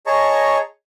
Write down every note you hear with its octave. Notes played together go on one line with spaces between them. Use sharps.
G#4 C#5 D#5 A5 A#5 C#6